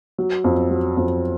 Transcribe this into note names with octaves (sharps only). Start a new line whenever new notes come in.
F#3
F2
F#3
F2